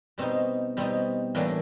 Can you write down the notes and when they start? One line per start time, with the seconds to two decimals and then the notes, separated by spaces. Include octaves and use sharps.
0.18 B2 G3 C4 D#4
0.77 B2 G3 C4 D#4
1.35 A2 E3 G3 A#3 D4